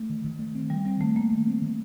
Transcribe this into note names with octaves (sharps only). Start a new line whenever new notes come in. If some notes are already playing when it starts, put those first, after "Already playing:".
Already playing: A3
D#3
D#3
A3
C4
D#3 G3
G3 C4
D#3 A3
A3 A#3
A3
C4
D#3